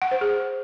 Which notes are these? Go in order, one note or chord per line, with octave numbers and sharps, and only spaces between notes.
F#5
C5
G#4